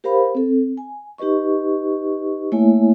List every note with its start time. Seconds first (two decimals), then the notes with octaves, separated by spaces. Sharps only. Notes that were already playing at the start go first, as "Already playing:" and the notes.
0.04 G4 A#4 C5 F5 B5
0.35 C4 A4
0.77 G#5
1.18 D#4 G4 B4 D#5 C#6
2.52 A3 A#3 E4 C#5 E5 G#5